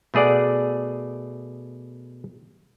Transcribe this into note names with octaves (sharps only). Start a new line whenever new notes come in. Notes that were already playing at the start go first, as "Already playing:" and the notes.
B2 A3 G#4 D5 F#5